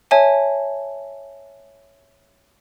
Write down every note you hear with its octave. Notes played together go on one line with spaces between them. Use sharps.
C#5 E5 G#5 A5